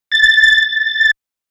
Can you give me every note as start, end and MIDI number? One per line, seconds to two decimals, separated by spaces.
0.12 1.11 93